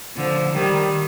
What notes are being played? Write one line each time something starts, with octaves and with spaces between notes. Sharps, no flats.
D3 F3
D#3 G3